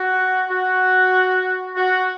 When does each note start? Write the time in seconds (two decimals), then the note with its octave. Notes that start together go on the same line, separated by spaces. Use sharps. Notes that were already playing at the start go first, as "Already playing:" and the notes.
Already playing: F#4
0.49 F#4
1.76 F#4